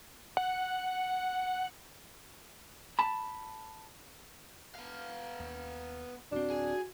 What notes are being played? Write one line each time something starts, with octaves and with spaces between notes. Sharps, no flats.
F#5
A5 B5
B3 F5
D#2
D1 C4 D4 F#4
G#4